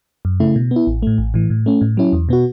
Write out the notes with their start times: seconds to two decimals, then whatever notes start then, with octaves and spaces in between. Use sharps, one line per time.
0.25 F#2
0.40 C#3 A3 E4
0.56 B2
0.71 B3
0.76 E4
0.87 A1
1.03 A2 A3
1.18 A1
1.34 A2 E3
1.50 A2
1.66 A3 C#4
1.81 A2
1.97 F#3 C#4 E4
2.13 E2
2.29 B2 B3 F#4